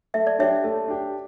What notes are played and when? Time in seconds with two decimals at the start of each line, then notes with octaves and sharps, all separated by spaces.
0.14 A3 E5
0.27 D5
0.39 D4 G4 C#5 E5
0.64 A3
0.88 D4 G4